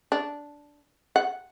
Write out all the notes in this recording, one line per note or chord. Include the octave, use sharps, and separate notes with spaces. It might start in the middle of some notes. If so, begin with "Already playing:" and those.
D4
F#5